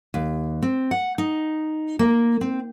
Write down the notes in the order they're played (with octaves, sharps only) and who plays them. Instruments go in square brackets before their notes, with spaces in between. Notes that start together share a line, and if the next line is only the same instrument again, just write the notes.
[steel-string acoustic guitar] D#2
C4
F#5
D#4
A#3
C4